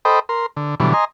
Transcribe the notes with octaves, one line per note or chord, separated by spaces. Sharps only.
A4 C5 D#5 G5 B5
A#4 C6
D3
B2 D3 E3 F#3 G3
D#5 G#5 A#5 C6